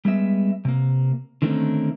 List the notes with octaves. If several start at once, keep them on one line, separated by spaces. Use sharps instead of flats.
G3 G#3 B3 E5
C3 A#3
D3 D#3 A3 A#3 C4 C#4